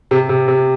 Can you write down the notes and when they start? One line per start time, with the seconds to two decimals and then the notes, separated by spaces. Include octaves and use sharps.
0.11 C3
0.29 C3
0.48 C3